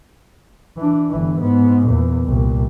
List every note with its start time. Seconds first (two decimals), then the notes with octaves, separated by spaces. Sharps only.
0.77 E3 D4
1.10 G1 E3
1.40 G#2 B3
1.87 E2 A#2
2.25 C2 A#2